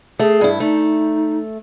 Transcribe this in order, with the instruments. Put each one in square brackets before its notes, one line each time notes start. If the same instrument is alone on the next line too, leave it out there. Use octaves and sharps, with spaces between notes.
[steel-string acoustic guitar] A3 [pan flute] G#4
[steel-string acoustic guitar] G2 E4
[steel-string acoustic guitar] A3 [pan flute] D#4